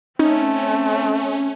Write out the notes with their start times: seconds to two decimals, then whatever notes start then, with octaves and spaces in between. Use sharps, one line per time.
0.19 A3 C4 C#4 D#4